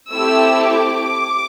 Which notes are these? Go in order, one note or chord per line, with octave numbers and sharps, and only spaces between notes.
A3 C4 E4 G4 E6
D6